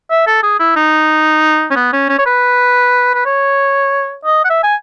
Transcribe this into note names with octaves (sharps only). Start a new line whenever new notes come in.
E5
A4
G#4
E4
D#4
C#4
B3
C#4
C#4
C#5
B4
B4
C#5
D#5
F#5
E5
G#5